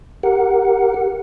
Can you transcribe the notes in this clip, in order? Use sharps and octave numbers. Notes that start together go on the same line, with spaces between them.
G4 A#4 F#5